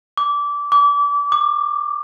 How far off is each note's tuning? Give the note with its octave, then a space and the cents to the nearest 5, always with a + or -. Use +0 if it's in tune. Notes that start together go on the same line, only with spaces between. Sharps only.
D6 -20
D6 -30
D6 +30